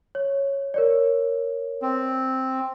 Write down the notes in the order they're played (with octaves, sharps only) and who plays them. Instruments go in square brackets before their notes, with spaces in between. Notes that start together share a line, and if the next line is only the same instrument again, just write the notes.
[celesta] C#5
A#4 C#5 D5
[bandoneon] C4